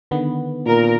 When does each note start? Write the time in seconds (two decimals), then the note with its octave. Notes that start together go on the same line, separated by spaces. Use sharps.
0.11 D3 D#3 B3
0.66 A#2 A#4